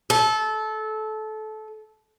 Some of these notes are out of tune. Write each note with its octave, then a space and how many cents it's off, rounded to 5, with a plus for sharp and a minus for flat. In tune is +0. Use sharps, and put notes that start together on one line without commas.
A4 -20